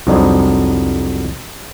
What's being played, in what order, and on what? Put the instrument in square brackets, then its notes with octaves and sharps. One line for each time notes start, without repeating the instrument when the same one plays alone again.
[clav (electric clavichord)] C2 F2 F#3 D4 D#4 C5